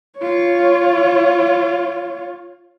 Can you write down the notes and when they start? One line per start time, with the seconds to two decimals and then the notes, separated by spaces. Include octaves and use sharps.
0.19 F4 C#5